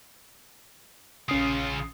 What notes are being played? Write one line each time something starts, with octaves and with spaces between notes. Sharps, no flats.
A#1 C#3 C#4 F4 D#6